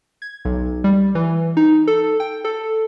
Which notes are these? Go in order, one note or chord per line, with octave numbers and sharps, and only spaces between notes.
G#6
B1
G3
E3
D#4
A4
G5
A4